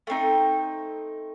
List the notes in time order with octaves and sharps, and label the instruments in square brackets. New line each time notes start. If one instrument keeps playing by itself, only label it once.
[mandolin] A3 C4 D#4